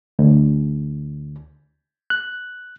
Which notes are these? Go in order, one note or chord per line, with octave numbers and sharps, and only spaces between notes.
D2
F#6